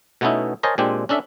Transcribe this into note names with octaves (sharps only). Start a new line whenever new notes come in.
B2 A3 B3 C#4 D#4 E4
A#4 C5 C#5 D#5 G#5 A5
A#2 G#3 C4 D4 G4
C#4 D4 A4 D5 E5